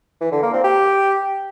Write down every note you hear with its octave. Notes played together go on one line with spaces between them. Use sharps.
E3
D3
A#3
C4
G4